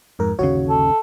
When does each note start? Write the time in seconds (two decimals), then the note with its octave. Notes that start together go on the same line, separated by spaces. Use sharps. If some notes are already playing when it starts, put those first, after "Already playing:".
0.19 F2 G#2 A#4
0.39 G1 D#2 C#3 F#4 C#5
0.69 A4